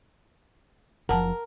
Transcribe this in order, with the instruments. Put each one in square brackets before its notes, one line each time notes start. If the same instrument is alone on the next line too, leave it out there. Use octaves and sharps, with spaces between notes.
[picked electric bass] F#1 F3 [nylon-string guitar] A#4 [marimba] F#5 A5